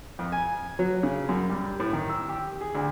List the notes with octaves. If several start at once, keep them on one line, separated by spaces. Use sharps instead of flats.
F2
G#5
F#3
C#3
F#2
G3
A2
D#3
E6
G4
G#4
D2